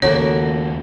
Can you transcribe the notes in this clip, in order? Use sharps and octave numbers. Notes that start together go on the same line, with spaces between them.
D#2 C#3 A#3 F#4 A4 C#5